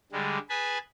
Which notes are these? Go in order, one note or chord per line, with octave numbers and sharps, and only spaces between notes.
D3 G3 G#3
G#4 B4 G#5 A5 B5